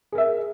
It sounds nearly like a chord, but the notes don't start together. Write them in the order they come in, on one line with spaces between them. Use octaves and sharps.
G#4 A#4 E5